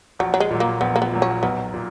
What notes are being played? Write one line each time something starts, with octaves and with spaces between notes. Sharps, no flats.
A#1 F#3
F#3
G#3
A#2 F#3
A#3
A#1 B3
A#3
B3
A#2 F#3
C#4
B1 B3
A#2